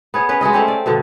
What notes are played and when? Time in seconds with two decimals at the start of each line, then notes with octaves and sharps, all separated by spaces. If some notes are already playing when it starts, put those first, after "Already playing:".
0.14 B3 G#4 C#5
0.29 C#4 A#4 B4
0.41 G#3 F#4 G#4 D#5
0.53 A3 C4 C#4 G4
0.68 D5
0.86 G2 B2 D3